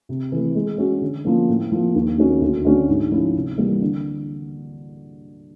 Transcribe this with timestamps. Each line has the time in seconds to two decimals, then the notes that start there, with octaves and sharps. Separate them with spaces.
0.09 C3
0.32 E3 A3
0.55 G#3
0.78 C#4 F#4
1.01 D3
1.25 F3 A#3 C#4
1.49 A2
1.72 F3 A#3
1.95 D#2
2.18 D#3 F#3 A#3 C#4
2.41 D2
2.65 D3 F#3 A3 C#4
2.88 G#2
3.12 F3 A3 C#4 E4
3.35 C3
3.58 E3 G3 A#3
3.81 D3